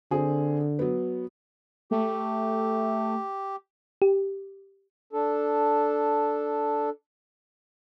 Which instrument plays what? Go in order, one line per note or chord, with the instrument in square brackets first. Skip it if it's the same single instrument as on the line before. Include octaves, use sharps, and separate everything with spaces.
[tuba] D3 [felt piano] C4 G#4
[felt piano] F#3 B3
[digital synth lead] A3 [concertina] G4
[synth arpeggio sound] G4
[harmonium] D4 A4